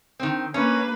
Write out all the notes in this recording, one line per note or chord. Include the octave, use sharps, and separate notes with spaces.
D#3 C4
A#3 C#4 B4